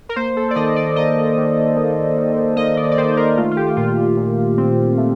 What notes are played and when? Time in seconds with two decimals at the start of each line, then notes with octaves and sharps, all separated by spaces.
0.09 A#4
0.16 A#3 C5
0.36 A4
0.51 D5
0.56 D#3 D#5
0.76 D5
0.96 A#3 D#5
1.37 D#3
1.76 A#3
2.17 D#3
2.57 A#3 D#5
2.77 D5
2.92 D5
2.98 D#3 C5
3.17 A#4
3.37 A3 F4
3.51 F4
3.57 G4
3.77 A#2 F4
4.17 A#2
4.58 C4
4.97 A3